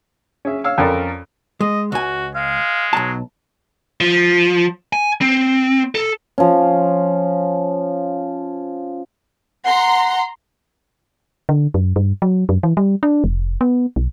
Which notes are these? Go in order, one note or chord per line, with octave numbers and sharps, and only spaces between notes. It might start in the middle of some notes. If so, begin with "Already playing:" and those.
C#4 G#4 E5
C#5 F5 E6
F2 C#4 A4 A#4 D5 B5
G#3 D#5
C#2 F#4 G#5
G#3 F5
B1 F#3 A5
F3
G#5
C4
A4
F3 C#4
F#5 A#5 C6
D3
F#2
G2
F#3
F#2
E3
G3
D4
F1
B3
B1